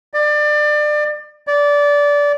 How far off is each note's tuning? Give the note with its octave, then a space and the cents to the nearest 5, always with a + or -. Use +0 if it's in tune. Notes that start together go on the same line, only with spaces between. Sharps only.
D5 +25
D5 -20